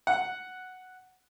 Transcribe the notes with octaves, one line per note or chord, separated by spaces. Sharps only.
F#5